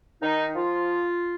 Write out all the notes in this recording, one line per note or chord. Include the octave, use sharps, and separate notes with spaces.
D#3 D#4
F3 F4